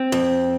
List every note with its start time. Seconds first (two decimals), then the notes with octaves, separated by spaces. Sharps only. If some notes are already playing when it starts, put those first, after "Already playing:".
Already playing: C4
0.12 F2